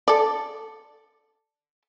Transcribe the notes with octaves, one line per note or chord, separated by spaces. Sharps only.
A4 D5